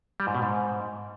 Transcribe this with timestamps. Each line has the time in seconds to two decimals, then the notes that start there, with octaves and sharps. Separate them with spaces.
0.20 G3
0.27 G#2
0.35 B2
0.42 G#2